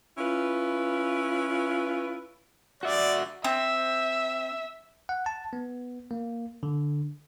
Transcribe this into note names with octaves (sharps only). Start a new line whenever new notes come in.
C#4 E4 F4 B4
F#4 D5 E5
C4 E5
F#5
A5
B3
A#3
D3